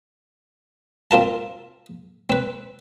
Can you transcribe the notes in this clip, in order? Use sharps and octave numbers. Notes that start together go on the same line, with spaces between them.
C4 F4 A#4 A5
C4 B4